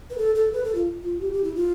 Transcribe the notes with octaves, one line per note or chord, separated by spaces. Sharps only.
B4
A4
A4
B4
A4
F4
F4
G4
G4
E4
F4